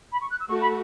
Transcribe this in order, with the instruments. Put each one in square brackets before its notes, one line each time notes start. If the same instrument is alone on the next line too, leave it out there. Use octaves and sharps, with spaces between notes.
[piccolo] B5
C#6
F#6
E6
[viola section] A3 F#4 A4 [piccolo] C#6
[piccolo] B5